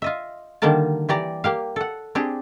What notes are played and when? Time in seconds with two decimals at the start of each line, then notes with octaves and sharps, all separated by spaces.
0.02 F4 D#5 E5
0.62 D3 D#3 G3 A#3 A#4 A5
1.09 E3 G4 D5 A#5
1.44 A#3 G4 F5
1.76 A4 F#5
2.15 C4 D4 G4 G#4 C5